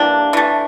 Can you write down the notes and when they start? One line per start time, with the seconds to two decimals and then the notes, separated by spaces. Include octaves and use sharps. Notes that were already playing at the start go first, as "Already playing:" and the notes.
Already playing: E3 G3 A#3 D4
0.33 E3 A3